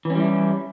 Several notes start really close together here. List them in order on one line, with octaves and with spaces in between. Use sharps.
E3 C#4 G3 E4